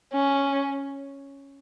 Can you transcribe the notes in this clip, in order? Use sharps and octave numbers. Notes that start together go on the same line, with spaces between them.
C#4